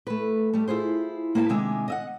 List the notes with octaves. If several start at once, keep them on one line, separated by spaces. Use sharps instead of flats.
A3 B4
G3 A3
E4 F4 G#4 C5
A#3 E4 B4 F5 A5
C3 D#3 G#3 D4 E5 G#5
D#5 E5 F#5